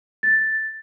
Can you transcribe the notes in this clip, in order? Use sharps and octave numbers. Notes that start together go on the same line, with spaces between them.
A6